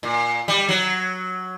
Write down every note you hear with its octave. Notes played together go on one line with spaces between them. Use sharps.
A#2
G3
F#3